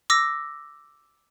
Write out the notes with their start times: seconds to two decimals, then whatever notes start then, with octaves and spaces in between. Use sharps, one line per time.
0.10 D6 E6 A#6